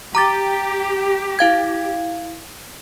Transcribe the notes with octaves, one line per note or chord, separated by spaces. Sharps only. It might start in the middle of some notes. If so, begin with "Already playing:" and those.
G4 A#5 D6 A6
E4 F5 G#6